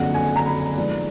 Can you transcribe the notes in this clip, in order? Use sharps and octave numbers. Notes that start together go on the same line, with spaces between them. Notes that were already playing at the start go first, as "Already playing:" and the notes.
Already playing: F#1 F2 D3 F#3 F#5
G#5
A#5
B5
G#2 F3 G#3 B3 D5